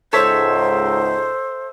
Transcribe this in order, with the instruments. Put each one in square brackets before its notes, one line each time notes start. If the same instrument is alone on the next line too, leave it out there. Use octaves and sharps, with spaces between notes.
[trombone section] C#2 G#2 D#4 [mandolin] A4 C#5 E5 [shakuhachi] C5